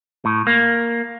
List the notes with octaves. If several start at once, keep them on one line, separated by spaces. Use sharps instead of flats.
A2
A#3